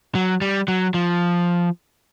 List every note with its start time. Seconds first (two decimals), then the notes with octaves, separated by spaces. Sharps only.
0.15 F#3
0.41 G3
0.68 F#3
0.94 F3